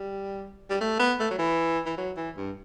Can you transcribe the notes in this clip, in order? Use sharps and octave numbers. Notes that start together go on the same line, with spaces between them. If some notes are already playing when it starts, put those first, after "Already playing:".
Already playing: G3
G3
A3
B3
A3
F#3
E3
E3
F#3
E3
G2